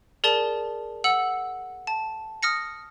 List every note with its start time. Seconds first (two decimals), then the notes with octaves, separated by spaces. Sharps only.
0.24 G#4 A#4 D5 A5
1.04 F#5 E6 C#7 F#7
1.87 A5
2.43 D#6 F6 A#6 C#7